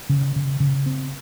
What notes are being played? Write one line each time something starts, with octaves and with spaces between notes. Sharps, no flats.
C#3
C#3
C#3
C4